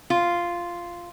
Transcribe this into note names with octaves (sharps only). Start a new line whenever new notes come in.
F4